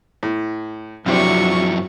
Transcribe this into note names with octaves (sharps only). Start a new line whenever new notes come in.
A2
F#2 C3 F3 F#3 C4 D4 E4 C#6